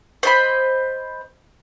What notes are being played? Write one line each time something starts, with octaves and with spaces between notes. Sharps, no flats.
C5 D#5 B5